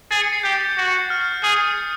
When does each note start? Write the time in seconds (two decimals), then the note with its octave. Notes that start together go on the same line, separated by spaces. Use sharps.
0.11 G#4 A6
0.21 C#7
0.33 C7
0.43 G4 G6
0.77 F#4
1.10 F6
1.22 F6
1.32 F6
1.43 G#4 D#6